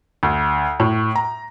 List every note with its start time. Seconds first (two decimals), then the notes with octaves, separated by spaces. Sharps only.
0.23 D2
0.80 A2
1.15 A#5